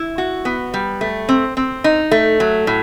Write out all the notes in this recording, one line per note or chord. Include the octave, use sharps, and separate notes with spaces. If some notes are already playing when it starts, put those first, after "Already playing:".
Already playing: E4
F#4
B3
G3
A3
C4
C4
D#4
A3
F#3
A2